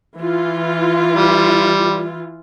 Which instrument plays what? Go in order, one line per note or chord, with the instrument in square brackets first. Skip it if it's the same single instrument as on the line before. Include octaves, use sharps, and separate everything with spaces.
[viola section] E3 F4
[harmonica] G3